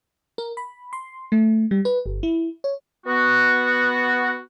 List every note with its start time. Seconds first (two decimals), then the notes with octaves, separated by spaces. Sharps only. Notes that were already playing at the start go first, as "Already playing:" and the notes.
0.38 A#4
0.57 B5
0.93 C6
1.32 A3
1.71 G3
1.85 B4
2.06 G1
2.23 E4
2.64 C#5
3.06 B3 F#4